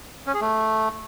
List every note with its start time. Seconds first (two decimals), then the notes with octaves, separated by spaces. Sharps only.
0.27 C#4
0.34 G#4
0.41 A3